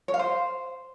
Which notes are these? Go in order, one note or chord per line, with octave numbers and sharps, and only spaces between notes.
C#5
F5
C5